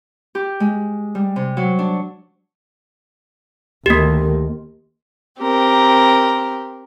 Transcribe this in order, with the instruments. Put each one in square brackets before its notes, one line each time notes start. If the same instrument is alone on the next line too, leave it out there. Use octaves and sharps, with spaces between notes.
[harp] G4
G#3
G3
C3
F#3
D4
[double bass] D2 D#3 [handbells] A#3 G4
[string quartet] C4 G4 A#4